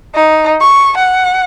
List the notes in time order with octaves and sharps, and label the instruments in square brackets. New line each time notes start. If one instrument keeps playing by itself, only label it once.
[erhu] D#4
C#6
F#5